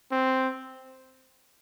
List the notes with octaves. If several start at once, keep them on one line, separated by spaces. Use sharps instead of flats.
C4